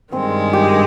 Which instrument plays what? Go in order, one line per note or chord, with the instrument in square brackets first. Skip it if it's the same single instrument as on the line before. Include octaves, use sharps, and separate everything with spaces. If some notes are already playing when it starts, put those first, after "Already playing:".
[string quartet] G2 D#3 G#3 [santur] C4
[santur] G4